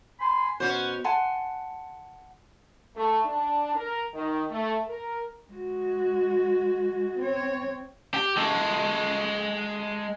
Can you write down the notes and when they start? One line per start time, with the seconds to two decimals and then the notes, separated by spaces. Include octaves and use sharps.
0.20 G#5 B5 C6
0.60 B2 C#4 C5 F#5
1.04 F#5 G#5 A5 C6
2.96 A3
3.25 D4
3.76 A#4
4.15 D#3
4.51 A3
4.88 A#4
5.51 G#3 F#4
7.19 C4 C#5
8.14 G4
8.37 G#3 A4